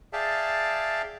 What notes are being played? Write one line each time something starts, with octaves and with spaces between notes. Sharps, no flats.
G#4 D5 E5 F5 G5 A5